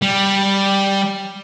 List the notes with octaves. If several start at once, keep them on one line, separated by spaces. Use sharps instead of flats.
G3